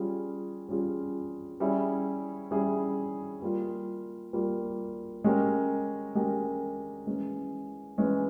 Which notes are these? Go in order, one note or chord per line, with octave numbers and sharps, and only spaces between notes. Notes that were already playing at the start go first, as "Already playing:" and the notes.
Already playing: G3 C#4 F4 G#4
G3 C#4 F4 G#4
G3 C#4 E4 G#4
G3 C#4 E4 G#4
G3 A#3 F4
G3 A#3 F4
G#3 C#4 G4 A#4
G#3 C#4 G4 A#4
E3 G#3 C#4
E3 G#3 C#4